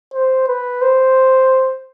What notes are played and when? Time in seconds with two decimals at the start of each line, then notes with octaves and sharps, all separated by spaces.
0.14 C5
0.48 B4
0.82 C5